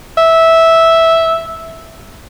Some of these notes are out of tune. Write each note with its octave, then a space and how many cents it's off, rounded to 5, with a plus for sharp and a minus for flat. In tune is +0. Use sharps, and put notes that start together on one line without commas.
E5 -10